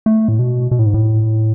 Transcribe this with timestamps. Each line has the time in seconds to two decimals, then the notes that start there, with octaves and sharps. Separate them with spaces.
0.06 A3
0.28 A2
0.39 B2
0.71 B2
0.79 A2
0.86 G#2
0.94 A2